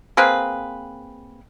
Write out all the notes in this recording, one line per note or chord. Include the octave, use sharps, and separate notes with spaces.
A#3 C4 G#4 B4